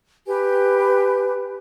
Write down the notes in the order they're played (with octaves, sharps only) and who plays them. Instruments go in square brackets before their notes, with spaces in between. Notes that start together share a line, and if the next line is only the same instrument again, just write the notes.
[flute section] G4 B4 G#5